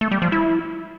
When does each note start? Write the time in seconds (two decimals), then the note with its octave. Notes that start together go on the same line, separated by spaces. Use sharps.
0.01 A3
0.11 G3
0.22 F3
0.32 E4